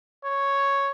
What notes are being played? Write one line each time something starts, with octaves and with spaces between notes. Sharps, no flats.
C#5